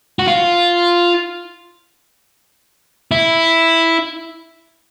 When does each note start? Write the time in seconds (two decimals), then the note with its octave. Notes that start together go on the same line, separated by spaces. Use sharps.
0.19 F#4
0.28 F4
3.11 E4